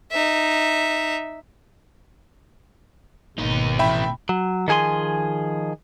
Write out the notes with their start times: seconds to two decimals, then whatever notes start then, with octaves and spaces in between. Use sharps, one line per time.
0.12 D#4 E5
3.38 G#1 D#2 B2 D#4
3.79 A2 E3 E5 G5 B5
4.29 F#3
4.68 D#3 F3 G#4 G#5 C6